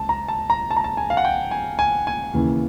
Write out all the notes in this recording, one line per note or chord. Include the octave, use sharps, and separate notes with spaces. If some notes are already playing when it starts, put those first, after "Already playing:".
Already playing: C#2 A5
A#5
A5
A#5
A5
A#5
A5
G#5
F5
F#5
G5
G#5
G#5
G#5
D#2 C#3 E3